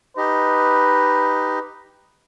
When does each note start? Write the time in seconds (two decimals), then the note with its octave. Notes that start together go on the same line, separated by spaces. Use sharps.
0.17 D#4 G4 B4 D#5